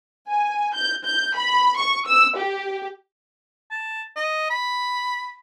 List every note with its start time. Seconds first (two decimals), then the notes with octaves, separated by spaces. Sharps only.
0.29 G#5
0.75 G6
1.05 G6
1.35 B5
1.77 C#6
2.07 E6
2.36 G4
3.71 A5
4.16 D#5
4.50 B5